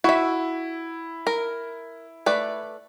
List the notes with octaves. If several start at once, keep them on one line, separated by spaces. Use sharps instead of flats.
E4 F#4 E5
A#4
A3 B4 D5